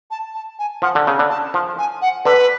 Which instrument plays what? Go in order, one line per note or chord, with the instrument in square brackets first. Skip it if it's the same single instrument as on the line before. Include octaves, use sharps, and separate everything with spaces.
[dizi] A5
A5
G#5
[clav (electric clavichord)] F3 [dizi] F#5
[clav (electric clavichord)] D3
[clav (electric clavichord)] C#3 [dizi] G#5
[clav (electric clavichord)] D3
[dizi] A5
[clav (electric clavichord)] F3 [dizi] A5
[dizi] G#5
F#5
[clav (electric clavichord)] D3 [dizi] B4